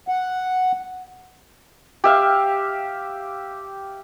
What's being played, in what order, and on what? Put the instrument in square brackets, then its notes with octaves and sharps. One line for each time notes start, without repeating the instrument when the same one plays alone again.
[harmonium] F#5
[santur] G4 E5 F5